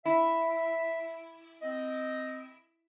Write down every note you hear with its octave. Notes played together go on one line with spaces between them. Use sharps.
E4 E5
C4 D#5